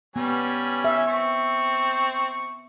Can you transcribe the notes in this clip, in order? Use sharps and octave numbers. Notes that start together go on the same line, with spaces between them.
G3 B3 C#4 G#5
E5
C4 C#6